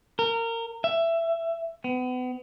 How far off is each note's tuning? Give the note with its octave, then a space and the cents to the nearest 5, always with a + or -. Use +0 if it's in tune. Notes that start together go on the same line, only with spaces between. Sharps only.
A#4 -25
E5 +15
B3 +35